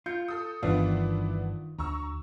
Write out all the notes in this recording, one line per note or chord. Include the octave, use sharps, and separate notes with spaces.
F4 G6 C#7
A4 D#6
G1 G2 D#3 E3 B3 D4 E4 F4
D2 A#5 C#6 E6